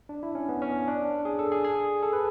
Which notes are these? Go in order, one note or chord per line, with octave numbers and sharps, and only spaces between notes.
D4
E4
C#4
B3
C#4
D4
G#4
A4
G#4
G#4
A4
B4